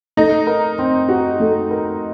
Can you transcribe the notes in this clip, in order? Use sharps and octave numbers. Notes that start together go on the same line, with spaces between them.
A3 D#4
A#4
C4
F#4
A3
A#4